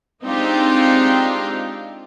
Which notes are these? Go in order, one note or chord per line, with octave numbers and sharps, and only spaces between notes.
G#3 C4 D4 D#4 F4 G4